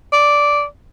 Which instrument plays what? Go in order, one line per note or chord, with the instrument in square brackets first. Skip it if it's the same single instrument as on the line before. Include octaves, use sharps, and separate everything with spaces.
[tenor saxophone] D5